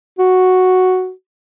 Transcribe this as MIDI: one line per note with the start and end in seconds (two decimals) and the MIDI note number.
0.19 1.11 66